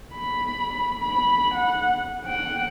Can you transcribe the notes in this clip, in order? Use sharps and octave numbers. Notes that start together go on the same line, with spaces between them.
B5
B5
F#5
F#5 G5